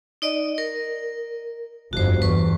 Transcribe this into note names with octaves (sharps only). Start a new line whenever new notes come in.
D#4 D5 D#5
A#4
G1 F2 F#4 C5
E2 B4 C#6